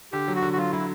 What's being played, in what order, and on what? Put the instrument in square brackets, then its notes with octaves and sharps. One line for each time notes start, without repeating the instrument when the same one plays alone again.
[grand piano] D3 [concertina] G4
[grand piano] F#3
[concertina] F#4
[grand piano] D3
[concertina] F#4
[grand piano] F#3 [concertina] F4
[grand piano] F#3 [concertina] E4